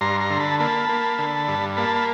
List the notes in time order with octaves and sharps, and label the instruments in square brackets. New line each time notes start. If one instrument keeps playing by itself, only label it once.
[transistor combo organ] G2 A#5 C6
A#5 C6
D3
A5 B5
A#3 A5 B5
A#3
D3
G2
A#3 A5 B5
B5